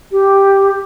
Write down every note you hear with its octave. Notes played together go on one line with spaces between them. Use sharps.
G4